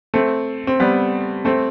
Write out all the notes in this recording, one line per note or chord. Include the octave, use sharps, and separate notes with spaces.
A3 C4
C4
G3 B3
A3 C4